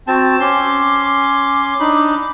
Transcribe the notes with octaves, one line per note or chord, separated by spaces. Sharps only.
C4 F#4 A5
C#4 C6 D6
D4 D#4 B5